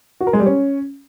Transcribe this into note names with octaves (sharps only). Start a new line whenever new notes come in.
F#4
A#4
G#3
G3
C#4